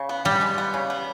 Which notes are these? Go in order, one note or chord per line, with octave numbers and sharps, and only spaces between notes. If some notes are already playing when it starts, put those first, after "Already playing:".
Already playing: C#3
B3
G3 B3
G#3
B3
C#3
B3